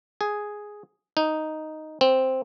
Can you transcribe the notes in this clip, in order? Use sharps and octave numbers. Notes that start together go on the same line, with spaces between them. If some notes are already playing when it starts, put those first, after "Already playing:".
G#4
D#4
C4